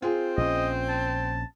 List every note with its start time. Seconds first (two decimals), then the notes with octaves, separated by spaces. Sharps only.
0.02 C4 F4 G#4
0.37 A#1 C#4 D#5
0.89 A5